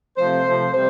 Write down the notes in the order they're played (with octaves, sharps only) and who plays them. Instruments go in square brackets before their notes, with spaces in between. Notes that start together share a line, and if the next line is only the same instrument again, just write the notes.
[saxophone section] C3 F3 A3 C5
C3 F3 A3
C3 G3 C5